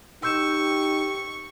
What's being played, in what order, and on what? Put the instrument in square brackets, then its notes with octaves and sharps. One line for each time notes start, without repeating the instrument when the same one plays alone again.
[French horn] D#4 [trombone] G4 [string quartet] C#6 [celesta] E6 G6 E7